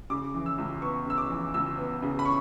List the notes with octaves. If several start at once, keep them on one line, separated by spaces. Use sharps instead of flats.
C#3 D6
E3
E6
C#2
B3 C#6
C#3 E6
D6
E3
C#2 E6
B3
C#3
B5
C#6